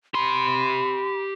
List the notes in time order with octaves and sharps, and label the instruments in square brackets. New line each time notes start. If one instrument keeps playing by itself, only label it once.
[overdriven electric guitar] G4 C6 [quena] B5